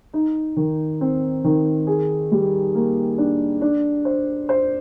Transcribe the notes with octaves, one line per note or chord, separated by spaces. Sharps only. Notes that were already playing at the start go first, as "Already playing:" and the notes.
D#4
D#3
C4
D#3
G#4
G3
A#3
D4
D4
C5
C5